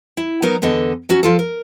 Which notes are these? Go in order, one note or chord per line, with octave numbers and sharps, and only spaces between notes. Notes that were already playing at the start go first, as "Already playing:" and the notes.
E4
F#3 B3 D#4 A#4 A#5
E2 D3 B3 A4 D#5
F#3 C#4 F#4
F3 F4 A4
A#4